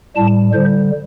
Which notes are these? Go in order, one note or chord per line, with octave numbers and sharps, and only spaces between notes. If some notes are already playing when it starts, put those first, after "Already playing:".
A2 G3 A5
D3 G3 C5